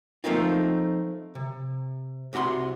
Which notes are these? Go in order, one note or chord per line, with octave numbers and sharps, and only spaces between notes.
F3 A3 A#3 C4 D#4 F4
C3
C2 C3 F#4 A#5 C6